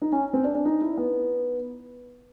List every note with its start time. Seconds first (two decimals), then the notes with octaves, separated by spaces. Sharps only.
0.02 D#4
0.12 C#4
0.33 C4
0.44 D4
0.55 D4
0.65 D#4
0.82 E4
0.97 B3